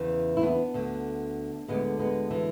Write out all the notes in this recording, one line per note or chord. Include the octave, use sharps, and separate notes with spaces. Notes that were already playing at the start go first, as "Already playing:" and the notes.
Already playing: E2 C#3 E3
E4
B3 D4
D2 D3
D2 D3 G#3 B3
G#3 B3
E3 G#3